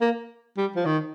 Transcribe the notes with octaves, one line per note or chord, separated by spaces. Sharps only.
A#3
G3
F3
D#3